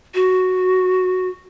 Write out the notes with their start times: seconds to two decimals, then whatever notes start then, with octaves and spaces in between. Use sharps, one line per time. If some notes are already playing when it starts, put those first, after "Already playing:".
0.14 F#4